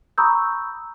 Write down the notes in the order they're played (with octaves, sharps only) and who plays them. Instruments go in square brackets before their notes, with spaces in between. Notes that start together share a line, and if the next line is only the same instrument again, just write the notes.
[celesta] A#5 B5 C#6 D#6 E6 G6